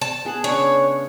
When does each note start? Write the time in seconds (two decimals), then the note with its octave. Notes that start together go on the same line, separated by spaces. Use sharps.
0.01 A5
0.25 B3 G#4 F#5
0.44 C#3 D4 C#5